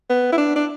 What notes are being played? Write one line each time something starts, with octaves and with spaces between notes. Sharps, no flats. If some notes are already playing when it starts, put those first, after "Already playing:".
B3
E4
D4
D4